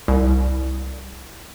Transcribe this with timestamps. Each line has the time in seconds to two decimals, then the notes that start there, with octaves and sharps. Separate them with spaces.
0.08 C2